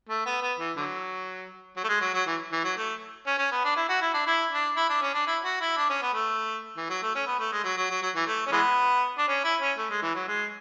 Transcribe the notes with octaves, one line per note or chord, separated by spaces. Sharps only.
A3
B3
B3
E3
D3 F#3
F#3
A3
G#3
F#3
F#3
E3
E3
F#3
A3
C#4
C#4
B3
D4
E4
F#4
E4
D4
E4
D4
E4
D4
C#4
D4
E4
F#4
E4
D4
C#4
B3
A3
E3
F#3
A3
C#4
B3
A3
G#3
F#3
F#3
F#3
F#3
E3
A3
C#4
E3 G#3 B3
D4
C#4
E4
C#4
A3
G#3
E3
F#3
G#3